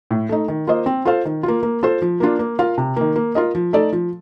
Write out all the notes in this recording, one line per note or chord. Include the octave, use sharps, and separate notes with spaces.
A2
A3 D#4
D#3
A#3 F4 C5 D#5
C4
F4 A4 C5 F5
D#3
A#3 F4
A#3
F4 A4 C5
F3
A#3 D4 F4
A#3
F4 A#4 F5
C3
D#3 A#3
A#3
F4 A#4 D#5
F3
A3 D#4 A4 D5
F3